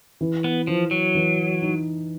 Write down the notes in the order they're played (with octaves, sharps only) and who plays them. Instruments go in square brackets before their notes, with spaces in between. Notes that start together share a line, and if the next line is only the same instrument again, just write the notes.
[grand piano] E3
[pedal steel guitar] B3
[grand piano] E3 [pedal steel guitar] F3
[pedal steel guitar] F#3
[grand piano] E3
D#4